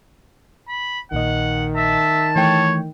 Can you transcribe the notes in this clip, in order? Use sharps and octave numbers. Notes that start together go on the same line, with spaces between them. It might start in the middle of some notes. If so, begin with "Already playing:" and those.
B5
A#1 A#2 D#3 D#5 F#5
E5 A5
E3 A3 C#5 G5